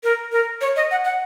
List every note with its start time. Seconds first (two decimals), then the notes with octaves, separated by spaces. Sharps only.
0.04 A#4
0.32 A#4
0.61 C#5
0.76 D#5
0.91 F#5
1.04 F#5